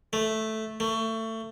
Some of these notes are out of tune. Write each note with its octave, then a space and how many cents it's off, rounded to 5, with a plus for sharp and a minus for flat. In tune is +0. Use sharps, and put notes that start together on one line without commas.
A3 -5
A3 +25